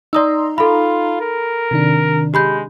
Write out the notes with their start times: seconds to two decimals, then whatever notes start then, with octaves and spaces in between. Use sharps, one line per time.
0.13 D#4 D5 A#5 C6 D#6 E6
0.58 F4 A4 B5
1.21 A#4
1.71 C3 D#3 D4
2.34 G#3 G4 B5 G6